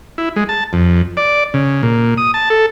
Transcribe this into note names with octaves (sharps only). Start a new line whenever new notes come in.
E4
G#3
A5
F2
D5
C#3
A#2
D#6
A5
A4